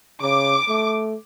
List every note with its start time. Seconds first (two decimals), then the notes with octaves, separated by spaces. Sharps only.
0.22 C#3 D6
0.69 A3